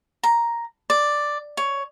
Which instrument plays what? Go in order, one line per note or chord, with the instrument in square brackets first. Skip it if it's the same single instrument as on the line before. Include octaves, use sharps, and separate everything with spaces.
[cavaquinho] A#5
D5
C#5